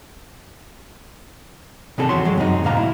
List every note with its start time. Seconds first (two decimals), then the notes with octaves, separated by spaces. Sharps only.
1.98 C3 D#3 C4 G#4 A4
2.09 E2 C3 D#3 F#4 C#5 C6
2.25 G2 F#3 G#3
2.38 F#2 C4 D#4
2.63 D#2 A2 C3 F5 A#5
2.77 E4